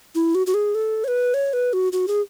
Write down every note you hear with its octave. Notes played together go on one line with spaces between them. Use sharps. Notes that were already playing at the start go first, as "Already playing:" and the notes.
E4
F#4
F#4
G#4
A4
C#5
B4
C#5
B4
F#4
F#4
G#4